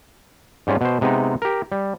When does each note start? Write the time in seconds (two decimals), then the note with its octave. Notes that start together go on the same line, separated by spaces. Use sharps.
0.67 G#2 G3 C#4 F4
0.81 B2 C5
1.01 C3 G#3 B3 D#4
1.42 G4 A#4
1.72 G3